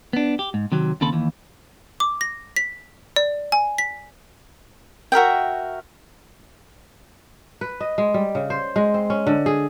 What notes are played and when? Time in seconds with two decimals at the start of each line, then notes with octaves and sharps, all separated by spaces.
0.13 B3 D4
0.39 G4
0.54 G#2
0.72 C3 D#3 F#3
1.01 D#2 C#3 C4 A4 A5 B5
1.13 D#2 E3
2.00 D6
2.21 A#6
2.56 B6
3.16 D5
3.52 G#5
3.78 B6
5.12 F#4 A#4 E5 G5
7.61 B4
7.81 D#5
7.98 G#3
8.14 G3
8.35 C#3
8.50 C5
8.76 G#3
8.94 C4
9.10 C#4
9.27 D3
9.46 G#4